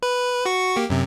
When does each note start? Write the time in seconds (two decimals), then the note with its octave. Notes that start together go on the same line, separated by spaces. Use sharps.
0.03 B4
0.45 F#4 C#6
0.76 A#3 G4
0.90 F#2 C3